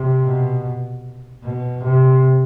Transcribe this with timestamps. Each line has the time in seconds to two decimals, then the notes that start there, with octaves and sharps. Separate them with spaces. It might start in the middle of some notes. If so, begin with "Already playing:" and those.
Already playing: C3
0.25 B2
1.44 B2
1.83 C3